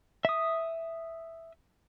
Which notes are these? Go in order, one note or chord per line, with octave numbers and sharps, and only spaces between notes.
E5 D#6